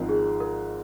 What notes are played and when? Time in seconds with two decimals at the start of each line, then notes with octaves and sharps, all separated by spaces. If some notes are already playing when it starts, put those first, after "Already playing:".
Already playing: G#1 G#2 F3 C4 A#4
0.09 G#4
0.40 A#4